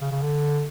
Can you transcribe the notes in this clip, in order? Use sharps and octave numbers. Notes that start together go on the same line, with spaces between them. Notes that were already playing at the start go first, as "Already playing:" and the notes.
C#3
C#3
D3